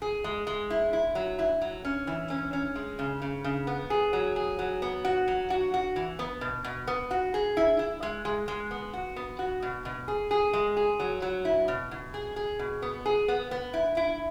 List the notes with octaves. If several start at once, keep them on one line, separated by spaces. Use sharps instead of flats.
G#4
G#3
G#3
E4
E4
F#3
E4
F#3
C#4
E3
C#4
C#4
G#3
C#3
C#3
C#3
B3
G#4
F#3
G#4
F#3
B3
F#4
F#3
F#4
F#4
E3
B3
B2
B2
B3
F#4
G#4
E4
E4
G#3
G#3
G#3
B3
F#4
B3
F#4
B2
B2
G#4
G#4
G#3
G#4
F#3
F#3
E4
B2
B2
G#4
G#4
B2
B3
G#4
B3
B3
E4
E4